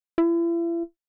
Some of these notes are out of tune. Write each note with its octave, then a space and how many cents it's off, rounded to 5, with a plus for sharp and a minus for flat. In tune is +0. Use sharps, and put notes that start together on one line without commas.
E4 +40